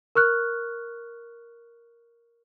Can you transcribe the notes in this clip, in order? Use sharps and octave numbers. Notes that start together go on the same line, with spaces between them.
A#4 C#6 F6 F#6